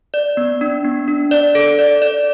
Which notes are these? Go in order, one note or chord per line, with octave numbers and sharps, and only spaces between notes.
D5
B3
D4
B3
D4
D5
A4
D5
D5